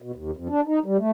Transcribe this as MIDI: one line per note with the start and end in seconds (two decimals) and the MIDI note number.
0.02 0.12 47
0.15 0.31 39
0.37 0.48 41
0.50 0.61 62
0.67 0.79 63
0.86 0.97 55
0.99 1.11 57